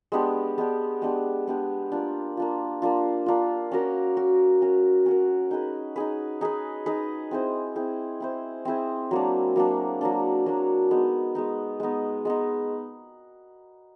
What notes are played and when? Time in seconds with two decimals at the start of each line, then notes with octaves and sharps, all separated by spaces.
0.12 G#3 B3 D4 G4
0.58 G#3 B3 D4 G4
1.02 G#3 B3 D4 G4
1.48 G#3 B3 D4 G4
1.92 A#3 D4 F4
2.37 A#3 D4 F4
2.82 A#3 D4 F4
3.26 A#3 D4 F4
3.72 C#4 F#4 A#4
4.17 C#4 F#4 A#4
4.62 C#4 F#4 A#4
5.06 C#4 F#4 A#4
5.51 D#4 G#4 B4
5.96 D#4 G#4 B4
6.41 D#4 G#4 B4
6.86 D#4 G#4 B4
7.31 C4 E4 G#4 C5
7.76 C4 E4 G#4 C5
8.20 C4 E4 G#4 C5
8.65 C4 E4 G#4 C5
9.11 F#3 A#3 D4
9.56 F#3 A#3 D4
10.01 F#3 A#3 D4
10.46 F#3 A#3 D4
10.91 G#3 B3 D#4
11.35 G#3 B3 D#4
11.80 G#3 B3 D#4
12.25 G#3 B3 D#4